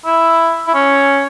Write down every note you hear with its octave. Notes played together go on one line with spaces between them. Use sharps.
E4
E4
C#4